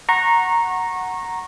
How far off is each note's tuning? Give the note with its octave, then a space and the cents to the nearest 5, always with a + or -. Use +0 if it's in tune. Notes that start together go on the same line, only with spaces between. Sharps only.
F#5 +0 A#5 +0 C#6 -25